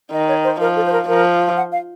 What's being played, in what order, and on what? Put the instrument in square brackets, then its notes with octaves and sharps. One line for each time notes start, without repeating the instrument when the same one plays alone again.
[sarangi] D#3 [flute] D#5
[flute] C#5
C5
[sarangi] F3 [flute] A#4
[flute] A4
C5
A#4
[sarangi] F3 [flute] A#4
[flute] F#5
F5